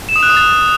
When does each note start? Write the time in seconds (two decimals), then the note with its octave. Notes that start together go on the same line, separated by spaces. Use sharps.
0.09 E7
0.16 D#6
0.23 F#6
0.30 D#6
0.37 A6